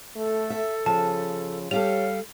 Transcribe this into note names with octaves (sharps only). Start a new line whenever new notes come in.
A3 A4
E5
C#3 F3 A5
G3 G4 A4 C#5 F5 F7